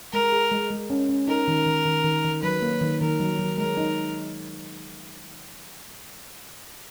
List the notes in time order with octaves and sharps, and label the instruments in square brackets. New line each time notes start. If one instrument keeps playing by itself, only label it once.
[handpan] G#3 [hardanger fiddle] A#4
[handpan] G#4
G#3
G#3
C#4
C#4
[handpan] D#4 [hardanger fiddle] A#4
[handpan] D#3
D#3
D#3
D#3
D#3
[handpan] F#3 [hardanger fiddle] B4
[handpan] A#3
D#3
[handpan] D#3 [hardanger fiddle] A#4
[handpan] F#3
F#3
[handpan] G#3 [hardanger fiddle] A#4
[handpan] D#4